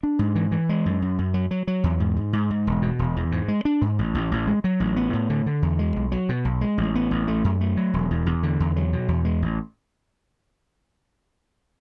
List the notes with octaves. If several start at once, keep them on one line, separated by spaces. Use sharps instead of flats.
D4
G#2
E3
E3
G#3
F#2
F#2
F#2
F#3
F#3
F#3
E2
G#2
G#2
G#2
G#2
E1
B2
E1
E2
G#2
G#3
D4
G#2
A1
A1
A1
G#3
F#3
A1
B3
A2
D3
D3
E2
G#3
B1
F#3
B2
B1
G#3
A1
B3
A1
A3
F#2
A3
F#3
E1
E2
E2
D3
E2
F#3
B2
E2
G#3
A1